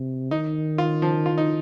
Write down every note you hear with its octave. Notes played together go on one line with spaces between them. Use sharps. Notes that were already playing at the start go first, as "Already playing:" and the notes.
Already playing: C3
D#3 D#4
F4
F3
F4
D#4